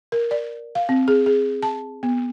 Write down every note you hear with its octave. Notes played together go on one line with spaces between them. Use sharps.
A#4
D5
F5
C4
G#4
G#4
A5
B3